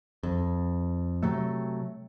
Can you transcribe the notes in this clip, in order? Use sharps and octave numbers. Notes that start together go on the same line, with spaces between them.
F2
C3 F#3 A3